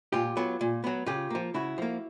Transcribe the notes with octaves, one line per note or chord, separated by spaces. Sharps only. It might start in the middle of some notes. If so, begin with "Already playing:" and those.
A#2 F4 G4
F#3 B3
A#2
F#3 B3
C#3 F4 G4
F3 A#3
C#3 E4 F#4
F3 A#3